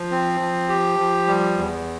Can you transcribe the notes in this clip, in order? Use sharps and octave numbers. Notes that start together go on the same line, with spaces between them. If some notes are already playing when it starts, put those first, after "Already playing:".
Already playing: F3
C4
F3
G4
F3
G3
E2